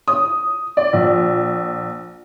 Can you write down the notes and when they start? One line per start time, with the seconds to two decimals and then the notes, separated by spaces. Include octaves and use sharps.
0.08 D#6
0.77 D5
0.93 A#1